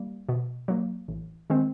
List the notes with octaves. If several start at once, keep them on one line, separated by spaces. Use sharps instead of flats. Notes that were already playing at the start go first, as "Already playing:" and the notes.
Already playing: G3 A#3
B2
F#3 A#3
A1
D#3 G#3 C4